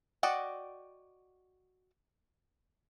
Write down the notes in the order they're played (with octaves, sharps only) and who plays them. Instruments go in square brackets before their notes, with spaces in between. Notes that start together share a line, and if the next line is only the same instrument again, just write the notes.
[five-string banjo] F#4 D5 D#5 F#5 G5